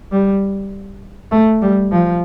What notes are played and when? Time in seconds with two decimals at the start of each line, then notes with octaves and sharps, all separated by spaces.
0.12 G3
1.31 A3
1.62 G3
1.92 F3